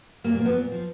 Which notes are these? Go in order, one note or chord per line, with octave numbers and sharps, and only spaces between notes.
A#2 A#3
A#3
F3 B3
A#2
F3